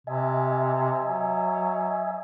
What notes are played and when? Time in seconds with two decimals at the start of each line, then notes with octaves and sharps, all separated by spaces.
0.07 C3 D#5 E5 G#5
1.04 F#3